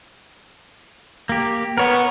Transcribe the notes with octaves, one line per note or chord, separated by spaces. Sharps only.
A#3 G4
B3 A#4 C#5 C#6